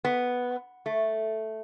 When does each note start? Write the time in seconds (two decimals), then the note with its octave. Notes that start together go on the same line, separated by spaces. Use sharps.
0.05 B3
0.86 A3